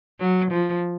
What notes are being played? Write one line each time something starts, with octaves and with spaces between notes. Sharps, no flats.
F#3
F3